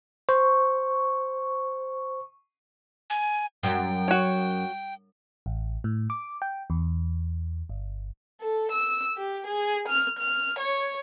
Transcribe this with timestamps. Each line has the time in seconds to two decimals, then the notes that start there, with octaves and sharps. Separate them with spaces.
0.29 C5 C#6
3.10 G#5
3.63 F#2 G5
4.08 F#4 C#5
5.46 A1
5.84 A2
6.10 D6
6.42 G5
6.70 E2
7.69 G1
8.41 A4
8.71 E6
9.17 G4
9.47 G#4
9.88 F6
10.19 F6
10.59 C#5